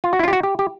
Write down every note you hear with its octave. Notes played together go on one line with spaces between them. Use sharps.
F4
F#4
E4
F4
G4
F#4
G4
G4